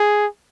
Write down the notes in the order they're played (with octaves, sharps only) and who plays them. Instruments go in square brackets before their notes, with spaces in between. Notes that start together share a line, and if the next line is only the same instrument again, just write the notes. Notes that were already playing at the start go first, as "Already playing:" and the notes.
Already playing: [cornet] G#4